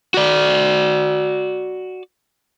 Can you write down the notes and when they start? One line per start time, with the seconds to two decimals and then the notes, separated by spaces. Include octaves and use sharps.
0.14 F#4 D5